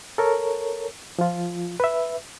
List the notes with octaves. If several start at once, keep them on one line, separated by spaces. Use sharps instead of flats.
A4 A#4 C#5
F3 F4
B4 E5